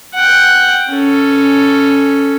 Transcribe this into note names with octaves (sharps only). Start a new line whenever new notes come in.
F#5 G5
C#4 A4